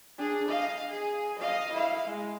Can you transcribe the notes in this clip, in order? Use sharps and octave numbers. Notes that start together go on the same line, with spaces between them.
D4 G#4
D#5 F5
G#4
D#5 F5
E4 F5
G#3